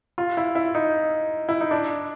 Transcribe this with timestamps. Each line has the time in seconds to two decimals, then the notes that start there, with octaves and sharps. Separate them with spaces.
0.18 F4
0.37 E4
0.55 E4
0.75 D#4
1.49 E4
1.61 D#4
1.71 D4